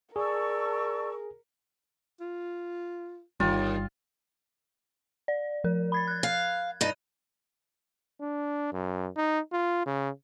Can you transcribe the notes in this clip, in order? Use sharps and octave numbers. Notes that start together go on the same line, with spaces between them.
G#4 A#4 D5 A5 C#6 E6
F4
G1 D#2 G3 F4
D5
F3 A#4
B5 G#6 A6
F#6 G#6
F5
G2 D#4
D4
F#2
D#4
F4
C#3